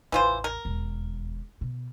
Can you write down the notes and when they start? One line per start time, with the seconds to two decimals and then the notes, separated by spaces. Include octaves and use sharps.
0.12 A1 E2 E3 F4 C5
0.44 A#4
0.65 E1 D#2
1.61 B2